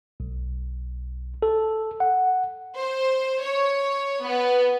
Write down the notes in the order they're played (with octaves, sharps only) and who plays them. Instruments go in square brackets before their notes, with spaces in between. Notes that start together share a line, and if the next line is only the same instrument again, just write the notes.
[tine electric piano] B1
A4
F#5
[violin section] C5
C#5
B3